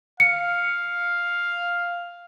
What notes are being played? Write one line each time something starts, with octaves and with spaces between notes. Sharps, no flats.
F5 C#7